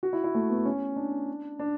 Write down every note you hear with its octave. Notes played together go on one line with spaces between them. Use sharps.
F#4
E4
E4
A3
B3
C#4
D4
D4